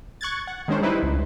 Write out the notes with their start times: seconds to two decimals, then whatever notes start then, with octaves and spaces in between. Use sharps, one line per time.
0.21 C#6 F#6 G#6 A6
0.47 F#5
0.68 D#3 G#3 C#4 D4 C5
0.82 G3 D#4 E4 B4 C5
1.03 C#2